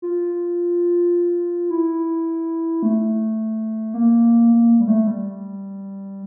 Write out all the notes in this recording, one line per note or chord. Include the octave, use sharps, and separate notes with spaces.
F4
E4
A3
A#3
A#3
G3
A3
G3